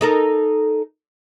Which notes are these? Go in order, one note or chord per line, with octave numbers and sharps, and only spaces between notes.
D#4 A4 A#4